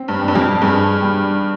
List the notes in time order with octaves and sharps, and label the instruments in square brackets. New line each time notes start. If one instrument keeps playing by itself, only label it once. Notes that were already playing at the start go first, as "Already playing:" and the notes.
Already playing: [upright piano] C4
[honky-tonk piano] G2
[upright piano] G3
[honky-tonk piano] G2
F2
[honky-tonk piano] G2 [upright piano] G#4
[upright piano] G3